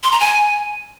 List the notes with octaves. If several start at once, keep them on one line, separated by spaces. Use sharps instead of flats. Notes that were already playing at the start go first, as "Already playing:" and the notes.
C6
A#5
G#5